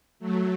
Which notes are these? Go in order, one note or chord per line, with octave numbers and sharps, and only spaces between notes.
F#3 A3